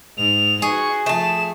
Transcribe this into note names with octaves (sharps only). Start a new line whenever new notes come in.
G#2 F7
D#4 F#4 G#4 B4 C#6
F3 A3 A5 E7